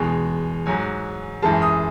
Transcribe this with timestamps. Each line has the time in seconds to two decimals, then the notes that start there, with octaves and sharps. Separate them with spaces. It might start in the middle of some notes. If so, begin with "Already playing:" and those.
Already playing: E2 B2 G#3 G#5
0.66 G#2 F#3 G#5
1.42 F#2 E3 G#3 A5
1.62 D#6